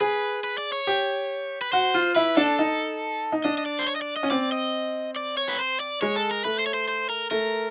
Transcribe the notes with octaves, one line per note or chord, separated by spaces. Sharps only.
G#4 B4
B4
D5
C#5
G4
B4
F#4 C5
F4
E4 B4
D4 A4
D#4
D#4
D4 D#5
D#5
D5
C5
C#5
D#5
D5
D#5
C#4
C4 D5
D#5
D5
C#5
B4
C5
D5
G#3 C#5
A4
A#4
A3 B4
C5
C#5
C5
C5
A#4
A3 A#4